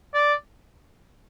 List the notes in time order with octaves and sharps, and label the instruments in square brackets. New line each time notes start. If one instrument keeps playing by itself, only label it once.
[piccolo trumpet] D5